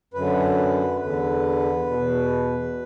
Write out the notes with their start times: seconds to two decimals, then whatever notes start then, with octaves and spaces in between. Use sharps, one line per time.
0.14 F#2 D3 B4
1.00 E2 D3 B4
1.86 B2
1.91 E2